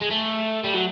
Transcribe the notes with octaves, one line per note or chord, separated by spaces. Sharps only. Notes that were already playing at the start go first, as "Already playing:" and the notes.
G#3
A3
G3
F#3